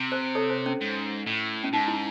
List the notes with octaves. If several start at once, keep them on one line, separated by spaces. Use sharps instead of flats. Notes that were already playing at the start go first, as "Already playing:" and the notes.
Already playing: C3
C5
A4 C#5
C5
C#4
G#2
A2
C#4
G#2 D#4
E4